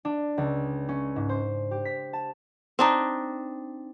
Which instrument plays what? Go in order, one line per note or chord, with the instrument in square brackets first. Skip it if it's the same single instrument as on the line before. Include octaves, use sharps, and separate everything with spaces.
[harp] D4
C#2
C#4
G#2
C5
G4
B6
A5
[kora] C4 D4 D#4